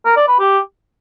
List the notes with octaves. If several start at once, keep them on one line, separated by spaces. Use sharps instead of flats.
A#4
D5
B4
G4